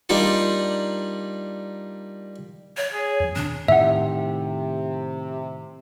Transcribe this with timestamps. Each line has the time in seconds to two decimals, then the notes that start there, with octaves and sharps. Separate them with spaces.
0.09 G3 A#3 D4 D#4 F4
2.77 C#5
2.93 G#4
3.20 E2 F3
3.36 B2 D#3 C4 D4
3.68 A2 C3 D#3 E5 F#5